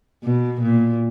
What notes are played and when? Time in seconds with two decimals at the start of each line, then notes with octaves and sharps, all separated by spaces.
0.24 B2
0.61 A#2